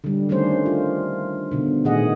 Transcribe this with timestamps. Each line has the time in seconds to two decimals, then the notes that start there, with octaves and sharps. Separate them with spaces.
0.04 D3 G3
0.29 D#3 G3 A3 C#4 D4 C5
0.66 F4
1.51 B2 D3
1.85 A#2 D#3 A3 G#4 D#5 F#5